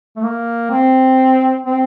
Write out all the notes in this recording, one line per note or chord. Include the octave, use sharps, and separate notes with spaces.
A3
A#3
C4
C4